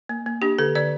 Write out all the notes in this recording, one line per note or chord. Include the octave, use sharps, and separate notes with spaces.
A#3
A#3
D4 G4
D3 A4
D3 D5